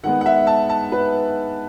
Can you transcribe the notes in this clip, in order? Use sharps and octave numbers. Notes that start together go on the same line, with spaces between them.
D#3 G#3 B3 F#5
F#5
E5
A5
A5
B4